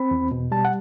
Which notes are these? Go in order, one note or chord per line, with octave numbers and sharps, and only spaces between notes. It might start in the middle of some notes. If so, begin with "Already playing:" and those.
Already playing: C4 B5
E2
B2
G3 A5
F#5